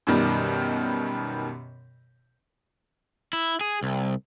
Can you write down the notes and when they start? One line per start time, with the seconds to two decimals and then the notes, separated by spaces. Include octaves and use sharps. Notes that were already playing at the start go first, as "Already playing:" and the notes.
0.07 F#2 B2 D#3 G3
3.33 E4
3.61 G#4
3.83 C2